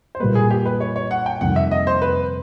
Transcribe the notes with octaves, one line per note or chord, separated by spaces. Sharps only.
C5
A#2 G3 A#3 B4
G#4
G4
B4
C#5
C#5
F#5
G5
F2 C3 D#3 G3 A#3 F#5
E5
D#5
C5
B4